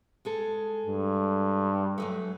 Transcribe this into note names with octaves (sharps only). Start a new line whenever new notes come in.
G#3 G#4 A4
G2
F#3 G#3 A3